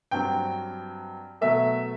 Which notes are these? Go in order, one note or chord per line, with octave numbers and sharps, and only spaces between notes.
G2 F#3 C4 G5
B2 F#3 A3 E5